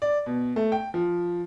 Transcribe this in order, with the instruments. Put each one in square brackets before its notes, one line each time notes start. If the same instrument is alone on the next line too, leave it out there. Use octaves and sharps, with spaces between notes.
[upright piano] D5
B2
A3
G5
F3